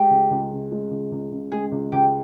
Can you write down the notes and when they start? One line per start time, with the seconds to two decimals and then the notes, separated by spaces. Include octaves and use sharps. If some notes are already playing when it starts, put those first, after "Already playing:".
Already playing: G#3 G4
0.10 C#2
0.31 C#2
0.52 C#3
0.72 G#3
0.91 C#2
1.12 C#2
1.31 C#3
1.52 G#3 G#4
1.72 C#2
1.92 C#2 G4